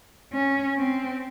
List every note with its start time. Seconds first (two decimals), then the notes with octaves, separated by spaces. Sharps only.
0.33 C#4
0.78 C4